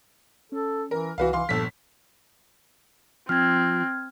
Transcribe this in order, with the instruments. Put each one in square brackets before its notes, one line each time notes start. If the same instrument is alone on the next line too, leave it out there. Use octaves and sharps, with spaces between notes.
[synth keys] C#4 [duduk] A4
[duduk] E3 [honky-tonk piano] A#4
[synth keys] C2 [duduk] E3 [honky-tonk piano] F#4 B4 F5
[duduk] E3 [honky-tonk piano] F5 C6
[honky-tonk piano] G1 B6 [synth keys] A#2 F3 [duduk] A4
[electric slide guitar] F3 [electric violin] C4 [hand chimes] F6 G#6